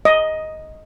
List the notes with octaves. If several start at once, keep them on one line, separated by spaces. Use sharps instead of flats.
D#5